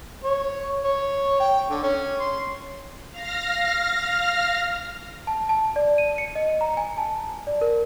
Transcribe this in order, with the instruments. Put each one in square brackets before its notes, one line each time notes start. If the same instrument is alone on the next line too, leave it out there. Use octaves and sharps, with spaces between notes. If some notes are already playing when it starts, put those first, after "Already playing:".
[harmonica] C#5
C#5
G5
D3
C#4
C6
[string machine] F5 F6 A#6
[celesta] A5
A5
D5
D#7
C#7
D#5
A#5
G#5
A5
D5
A#4